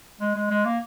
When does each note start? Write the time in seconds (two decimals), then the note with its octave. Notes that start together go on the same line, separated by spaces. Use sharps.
0.21 G#3
0.36 G#3
0.50 G#3
0.65 A#3